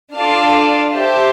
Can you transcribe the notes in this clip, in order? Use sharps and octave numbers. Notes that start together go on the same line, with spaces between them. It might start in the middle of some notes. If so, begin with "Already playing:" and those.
D4 F4 A4 D5 F5
G4 C5 E5 A5